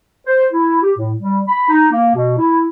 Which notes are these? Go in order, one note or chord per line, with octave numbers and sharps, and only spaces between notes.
C5
E4
G4
A2
G3
B5
D#4
A#3
B2
E4